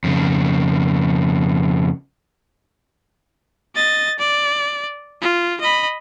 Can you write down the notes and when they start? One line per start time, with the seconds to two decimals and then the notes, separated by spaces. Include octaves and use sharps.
0.04 F2 C#3
3.76 D#5 A6
4.19 D5
5.22 F4
5.61 D#5 B5